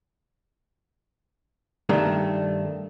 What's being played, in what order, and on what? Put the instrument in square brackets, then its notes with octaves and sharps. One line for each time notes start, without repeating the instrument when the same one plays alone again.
[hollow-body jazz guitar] G2 D#3 A3